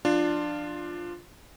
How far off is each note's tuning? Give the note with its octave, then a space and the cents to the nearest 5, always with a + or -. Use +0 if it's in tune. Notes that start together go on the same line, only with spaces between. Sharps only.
F3 -10 D4 +15 F4 +0